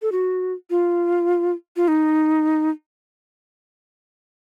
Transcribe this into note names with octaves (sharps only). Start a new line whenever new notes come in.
A4
F#4
F4
F4
D#4